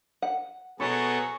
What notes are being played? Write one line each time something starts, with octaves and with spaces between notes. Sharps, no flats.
F#5
B2 F#3 B3 G#4 A4 C#5